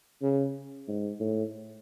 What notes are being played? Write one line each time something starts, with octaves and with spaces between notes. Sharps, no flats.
C#3
G#2
A2